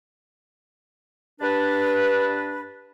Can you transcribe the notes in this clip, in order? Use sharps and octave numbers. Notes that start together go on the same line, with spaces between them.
G2 D4 B4